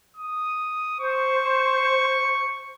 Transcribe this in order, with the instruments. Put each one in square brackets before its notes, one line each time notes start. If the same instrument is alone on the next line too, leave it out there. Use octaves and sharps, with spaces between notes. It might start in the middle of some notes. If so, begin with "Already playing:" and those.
[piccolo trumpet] D#6
[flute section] C5 [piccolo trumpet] C#6